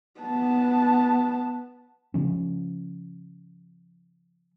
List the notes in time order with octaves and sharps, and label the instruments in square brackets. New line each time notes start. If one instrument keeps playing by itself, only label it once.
[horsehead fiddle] B3 A5
[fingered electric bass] C#3 F3 C#4